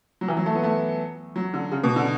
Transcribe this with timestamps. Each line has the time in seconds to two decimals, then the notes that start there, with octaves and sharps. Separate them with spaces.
0.21 F#3
0.28 E3
0.37 F#3
0.46 A3
0.55 B3
0.63 A3
1.36 F#3
1.54 D3
1.72 C#3
1.84 B2
1.96 D3